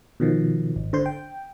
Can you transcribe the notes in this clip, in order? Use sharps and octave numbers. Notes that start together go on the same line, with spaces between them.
B2 D#3 F3
G#1
D3 C5 C6
G5